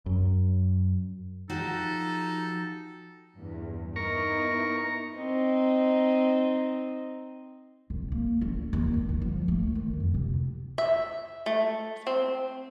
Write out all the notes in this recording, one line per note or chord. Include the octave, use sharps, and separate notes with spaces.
F#2
F3 D#4 F#4 G4 A4
E2 G2
B3 D#4 E4 A#4 C#6
C4 D#4
C2
A#3
C#4
D#2
G2
D#3
F3
A3
D#3
F2
C3
E5
A3
C4